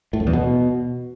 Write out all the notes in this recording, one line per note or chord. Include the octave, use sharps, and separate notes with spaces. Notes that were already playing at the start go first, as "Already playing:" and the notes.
A2
F#2
E2
B2